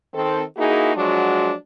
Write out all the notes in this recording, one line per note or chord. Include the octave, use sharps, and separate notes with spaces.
D#3 C4 A4
A#3 D#4 E4 F#4 G#4
F3 F#3 G#3 D4 F#4